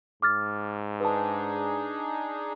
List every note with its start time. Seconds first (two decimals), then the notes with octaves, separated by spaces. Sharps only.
0.22 G#2 D6 F6 A6
1.00 D4 D#4 G#4 B4 A5